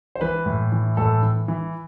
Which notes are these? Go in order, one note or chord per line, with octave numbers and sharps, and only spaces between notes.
C5
E3 B4
A2
E3
A2 A4
E3
E3